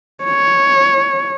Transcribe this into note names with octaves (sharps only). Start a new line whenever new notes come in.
C#5